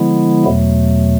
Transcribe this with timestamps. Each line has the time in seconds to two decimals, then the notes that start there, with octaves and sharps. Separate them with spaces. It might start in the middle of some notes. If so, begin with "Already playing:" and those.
Already playing: D3 F3 G#3 B3 E4
0.44 E2 B2 F#3 A3